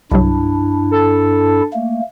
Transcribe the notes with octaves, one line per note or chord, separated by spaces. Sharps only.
C2 G2 C3 F#3 D4 E4
A4
A3 A#3